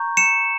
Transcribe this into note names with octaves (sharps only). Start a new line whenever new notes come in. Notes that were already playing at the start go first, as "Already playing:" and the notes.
Already playing: A#5 C#6 G6
C#7 E7